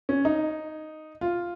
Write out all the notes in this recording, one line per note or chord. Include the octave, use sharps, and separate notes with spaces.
C#4
D#4
F4